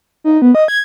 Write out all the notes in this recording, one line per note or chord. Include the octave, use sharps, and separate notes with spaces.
D#4
B3
D#5
G#6